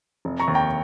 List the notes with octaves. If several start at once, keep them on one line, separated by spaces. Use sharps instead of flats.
F1
A#5 C#6
D#2
G5 A#5